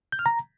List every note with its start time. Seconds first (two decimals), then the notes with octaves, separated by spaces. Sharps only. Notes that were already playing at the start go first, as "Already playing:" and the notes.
0.12 G6
0.19 F6
0.26 A#5